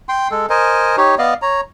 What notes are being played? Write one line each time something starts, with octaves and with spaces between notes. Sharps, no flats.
G5 C6
G#3 A4
A#4 C5 D#5 G#5
D#4 G4 C#5
B3 D5 D#5 F5
C#5 A#5